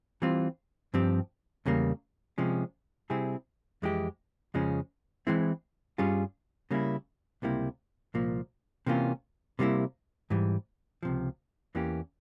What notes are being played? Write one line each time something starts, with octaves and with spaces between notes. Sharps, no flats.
E3 G3 C4 F4
G2 F3 C4 G4
E2 C#3 G3 A#3
C3 F3 G#3 C#4
C3 G3 C4 E4 G#4
F2 E3 G#3 E4 G4
F2 C#3 F3 G#3 C#4
E3 G#3 C4 E4
G2 G3 C#4 F4 G#4
C#3 G3 A#3 C#4 E4
C#2 C3 G3 A#3 E4
C2 A#2 F3 A#3
C3 E3 A#3 C#4 F4
C3 G3 A#3 E4
G#2 E3 G3
C#2 C3 F3
E2 E3 A#3 C#4 G4